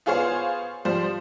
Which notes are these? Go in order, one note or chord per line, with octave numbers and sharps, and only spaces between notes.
B3 F4 G#4 C5 C#5 F5
F3 G3 C5